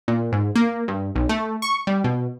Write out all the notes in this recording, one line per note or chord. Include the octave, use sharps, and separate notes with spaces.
A#2
G#2
A#3
G2
B1
A3
C#6
G3
B2